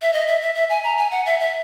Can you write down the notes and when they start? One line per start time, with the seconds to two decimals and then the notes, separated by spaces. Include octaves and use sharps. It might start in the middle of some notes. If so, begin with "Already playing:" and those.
0.02 E5
0.13 D#5
0.28 E5
0.41 E5
0.55 E5
0.70 G#5
0.84 A#5
0.98 G#5
1.11 F#5
1.26 E5
1.40 E5